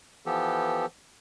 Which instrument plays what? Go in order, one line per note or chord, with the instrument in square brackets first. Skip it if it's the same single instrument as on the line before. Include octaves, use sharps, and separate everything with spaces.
[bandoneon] E3 F3 B3 G4 A4